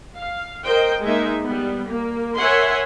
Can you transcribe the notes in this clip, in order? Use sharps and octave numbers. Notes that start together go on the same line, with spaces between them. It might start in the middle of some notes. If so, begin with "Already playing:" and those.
F5
A#4 C5 D#5 G5
G#3 A#3 D#4 E5
G3 B3
A#3
A#4 C#5 E5 F#5 G#5 C6